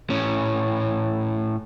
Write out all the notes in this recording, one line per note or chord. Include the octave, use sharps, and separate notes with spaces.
A2 C#4